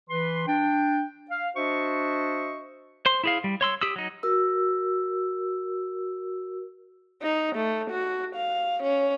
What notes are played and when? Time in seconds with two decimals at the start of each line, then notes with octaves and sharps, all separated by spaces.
0.10 E3 B4 C6
0.48 D4 G5
1.30 F5
1.56 D4 F#4 C5 D#5 E5 C#6
3.06 C5 C6
3.24 E4 G#4 F5
3.44 G3
3.61 C#5 C6 E6
3.81 G4 D#6 E6
3.96 F#3 D#4
4.23 F#4 A#4 E6
7.22 D#4
7.56 A3
7.91 F#4
8.36 F5
8.83 C#4